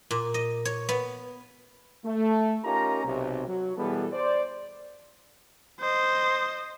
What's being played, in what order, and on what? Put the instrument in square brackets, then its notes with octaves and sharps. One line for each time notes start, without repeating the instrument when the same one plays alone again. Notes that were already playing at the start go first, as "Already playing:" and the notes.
[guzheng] A#2
D#5
C#5
B3
[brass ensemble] A3
C#4 D#4 F4 G4 A#4 A#5
B1 C3
F#3
B2 E3 G3 B3 G#4 A4
C5 D5
[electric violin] C5 D#5